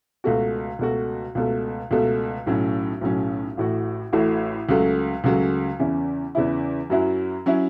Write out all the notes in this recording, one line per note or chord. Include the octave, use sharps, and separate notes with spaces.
C#2 B2 A3 F#4
C#2 B2 A3 F#4
C#2 B2 A3
C#2 B2 A3
B1 A2 F#3 C#4
B1 A2 F#3 C#4
A1 A2 A3 F#4
A1 A2 A3 F#4
C#2 C#3 F#3 A3
C#2 C#3 F#3 A3
E2 C#3 E3 C#4 E4
E2 C#3 E3 C#4 E4
F#2 F#3 C#4 E4
F#3 C#4 E4